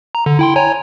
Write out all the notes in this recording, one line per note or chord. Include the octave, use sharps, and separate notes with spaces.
A#5
D3
E4 G5 C6
C#5 G#5 A#5